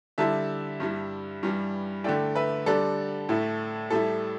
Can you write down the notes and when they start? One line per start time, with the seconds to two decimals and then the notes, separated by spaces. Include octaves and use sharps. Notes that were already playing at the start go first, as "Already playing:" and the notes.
0.18 D3 G3 E4 E5 A5
0.80 G2 G3 E4
1.43 G2 E3 G3
2.04 D3 A3 E4 D5 G5
2.35 B4 E5
2.66 D3 G3 D4 A4 D5
3.29 A2 A3 E4
3.90 A2 G3 E4 A4